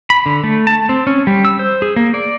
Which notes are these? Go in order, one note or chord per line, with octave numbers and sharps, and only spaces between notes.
B5
D3
A3
A5
C4
C#4
G3
E6
C5
G#4
A#3
D5